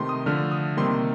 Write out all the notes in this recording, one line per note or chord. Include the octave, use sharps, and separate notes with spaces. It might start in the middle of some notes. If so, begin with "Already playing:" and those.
Already playing: C3 D#3 A3 C6
D#6
D3 F3 A3 F6
D#6
C3 D#3 G3 A#3 C6